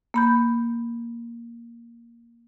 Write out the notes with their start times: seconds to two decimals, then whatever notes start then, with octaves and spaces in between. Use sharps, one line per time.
0.14 A#3 B5 G6